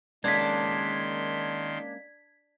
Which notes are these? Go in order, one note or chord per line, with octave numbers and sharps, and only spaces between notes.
D#3 G#3 A#3 C#4 D4 C6 G#6 B6